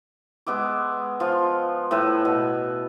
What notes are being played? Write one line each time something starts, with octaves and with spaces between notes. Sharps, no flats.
G#3 B3 E5 D6
F3 F4
A2 A4 B4 E5
B2